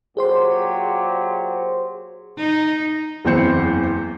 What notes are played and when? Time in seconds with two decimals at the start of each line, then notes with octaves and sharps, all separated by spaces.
0.17 A#2 F#3 G4 G#4 C5 C6
2.37 D#4
3.25 F#1 E2 E3 C4 C5 C#7